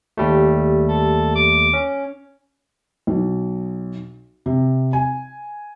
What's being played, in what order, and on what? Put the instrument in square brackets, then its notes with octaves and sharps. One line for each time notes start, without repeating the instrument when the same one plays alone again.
[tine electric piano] D#2 G3 A3
[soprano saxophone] A4
D6
[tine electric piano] C#4
[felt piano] B1
C3
G#5